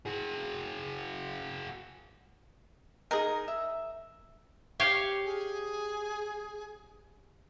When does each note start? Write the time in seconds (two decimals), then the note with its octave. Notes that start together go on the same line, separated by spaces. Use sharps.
0.05 F#4 G#4
3.11 D#4 G#4 A#4 D#6
3.48 E5
4.80 G4 C#5 F5
5.24 G#4